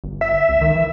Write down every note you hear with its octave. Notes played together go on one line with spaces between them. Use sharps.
G1
E5
C#2
D#3
E3